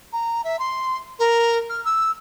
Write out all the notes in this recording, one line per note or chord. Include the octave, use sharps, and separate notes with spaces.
A#5
E5
C6
A#4
F6
E6